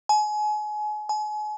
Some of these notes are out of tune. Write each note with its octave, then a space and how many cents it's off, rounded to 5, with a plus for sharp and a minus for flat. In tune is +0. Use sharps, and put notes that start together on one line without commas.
G#5 +30
G#5 +35